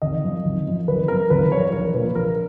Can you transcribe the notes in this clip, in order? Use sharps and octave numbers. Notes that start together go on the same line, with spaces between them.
G#1 D#5
F#2 F3
G#1
F#2 F3
G#1 B4
F#2 F3 A#4
G#1 B4
F#2 F3 C#5
A#1 A#4
A#2 F3 B4
A#1 A#4